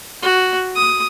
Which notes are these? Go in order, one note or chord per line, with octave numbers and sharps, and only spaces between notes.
F#4
D#6